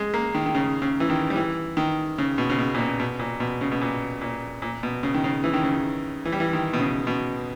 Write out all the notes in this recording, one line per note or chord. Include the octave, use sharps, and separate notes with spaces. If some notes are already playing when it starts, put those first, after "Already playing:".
Already playing: G#3
A#3
D#3
D#3
C#3
C#3
E3
D#3
G3
E3
D#3
C#3
B2
C#3
B2
A#2
B2
B2
A#2
B2
C#3
B2
A#2
A#2
A#2
B2
C#3
D#3
C#3
E3
D#3
C#3
D#3
E3
G3
E3
D#3
B2
C#3
B2